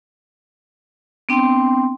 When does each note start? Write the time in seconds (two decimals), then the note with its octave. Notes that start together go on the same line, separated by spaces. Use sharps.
1.29 B3 C4 D4 G5 C6